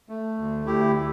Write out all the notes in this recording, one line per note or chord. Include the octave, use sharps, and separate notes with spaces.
A3
D2
D2 E4 G4
A3